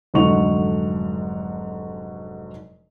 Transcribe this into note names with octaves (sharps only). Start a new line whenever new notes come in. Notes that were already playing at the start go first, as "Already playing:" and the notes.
F1 G#2 D3 F#3 C#6 F7